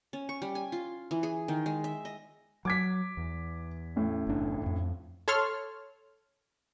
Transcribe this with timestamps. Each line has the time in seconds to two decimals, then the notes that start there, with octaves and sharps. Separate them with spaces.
0.13 C#4
0.29 C#6
0.42 G3
0.55 G#5
0.72 F4
1.11 E3
1.23 G#4
1.48 D#3
1.66 G#3
1.84 E5
2.05 D#5
2.65 F#3 D6 G#6 B6
3.17 E2
3.96 A1 A2
4.27 F#1 D4
4.62 D1 F2
5.28 A4 C#5 A5 C6 F6